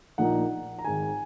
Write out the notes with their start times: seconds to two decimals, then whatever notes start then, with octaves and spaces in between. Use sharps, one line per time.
0.18 A#1 A#2 A#3 D#4 F#5
0.79 A#5
0.84 G#1 G#2 D#3 G#5